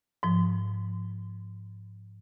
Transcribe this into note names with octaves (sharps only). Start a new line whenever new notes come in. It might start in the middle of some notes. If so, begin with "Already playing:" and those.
G#2 F3